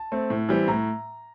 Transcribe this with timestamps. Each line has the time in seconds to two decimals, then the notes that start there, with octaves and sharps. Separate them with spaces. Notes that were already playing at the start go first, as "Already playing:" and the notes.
Already playing: A5
0.12 A3 C4
0.30 A2
0.49 E3 G3 C4
0.68 A2 A#5